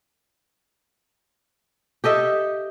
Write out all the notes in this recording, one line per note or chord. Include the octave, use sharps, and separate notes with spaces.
G4 A4 D#5 E5